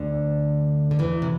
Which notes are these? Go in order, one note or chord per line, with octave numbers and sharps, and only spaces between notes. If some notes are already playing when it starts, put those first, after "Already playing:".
Already playing: D2 D3
D3
E2 E3
C3